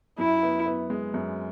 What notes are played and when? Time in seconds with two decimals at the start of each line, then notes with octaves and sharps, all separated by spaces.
0.18 F#2 E4
0.43 B3
0.66 B3
0.90 G#3
1.14 F#2